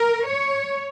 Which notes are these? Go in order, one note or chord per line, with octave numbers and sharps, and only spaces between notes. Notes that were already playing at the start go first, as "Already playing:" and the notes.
Already playing: A#4
C#5